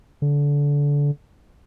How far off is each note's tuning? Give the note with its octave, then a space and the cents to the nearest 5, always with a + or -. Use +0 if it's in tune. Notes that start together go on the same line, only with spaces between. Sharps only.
D3 -25